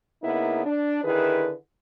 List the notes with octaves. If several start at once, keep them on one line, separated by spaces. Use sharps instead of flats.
C#3 A#3 B3 D#4 E4
D4
D3 D#3 E4 G#4 B4